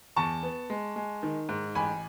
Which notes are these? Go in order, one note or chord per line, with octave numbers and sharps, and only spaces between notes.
E2 A5 C#6
B3
G#3
G#3
D#3
G#2
A1 G#5 B5